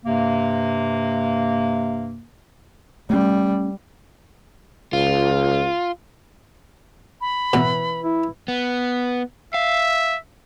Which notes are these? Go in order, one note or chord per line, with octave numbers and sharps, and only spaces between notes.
G2 C3 A#3
G3 A3 C#4
C#2 F4
B5
B2 E3
E4
B3
E5 F5